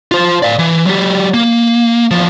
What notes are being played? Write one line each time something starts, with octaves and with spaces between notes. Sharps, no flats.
F4 C5
D5 F5
E3
F#3 G4
A#3
E2 F3